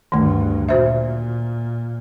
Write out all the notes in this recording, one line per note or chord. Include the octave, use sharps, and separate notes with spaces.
D2 G2 D#3 A3
A#2 F#4 C5 E5